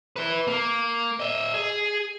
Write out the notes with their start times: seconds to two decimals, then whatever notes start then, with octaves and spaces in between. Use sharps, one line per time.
0.16 B4 E5
0.47 A#3
1.20 D#5 E5
1.54 G#4